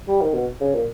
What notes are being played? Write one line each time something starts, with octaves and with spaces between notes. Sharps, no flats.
G3
D#3
B2
C#3
A#2